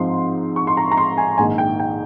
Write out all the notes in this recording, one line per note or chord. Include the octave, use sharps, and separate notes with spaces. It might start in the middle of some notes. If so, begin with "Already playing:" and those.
Already playing: G#2 F3 C4 D#4 C6
C#6
C6
A#5
A#5
C6
G#5
A#1 G#2 D#3 G#5
G5
G5